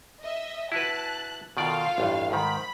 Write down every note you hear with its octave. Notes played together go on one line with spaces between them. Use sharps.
D#5 E5
E4 F#4 B4 A5 F#6
B2 D#3 F4 A4 D5 F5
A1 E2 G2
G#2 D#3 B5